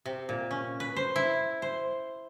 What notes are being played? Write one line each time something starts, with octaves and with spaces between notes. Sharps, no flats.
C3
A#2
C#4
B4
C5
E4
C5